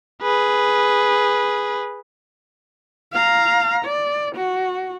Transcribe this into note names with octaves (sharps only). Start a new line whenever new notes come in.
G#4 B4
F5 A#5
D5
F#4